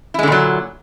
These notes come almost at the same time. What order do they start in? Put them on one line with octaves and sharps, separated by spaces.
E4 G#3 D3 A#2 F#3